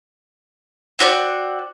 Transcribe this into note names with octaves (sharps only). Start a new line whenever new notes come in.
C4 F#4 C5 D5